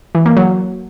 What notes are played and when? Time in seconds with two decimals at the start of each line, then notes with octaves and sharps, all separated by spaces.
0.15 E3
0.26 A#3
0.37 F#3